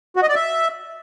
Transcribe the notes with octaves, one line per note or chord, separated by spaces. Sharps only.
F#4
D#5
D5
E5